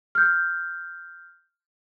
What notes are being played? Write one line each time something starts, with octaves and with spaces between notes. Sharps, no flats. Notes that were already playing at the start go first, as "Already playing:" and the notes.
F6 G6